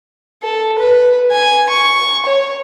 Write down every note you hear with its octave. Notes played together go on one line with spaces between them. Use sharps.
A4
B4
G#5
C#6
C#5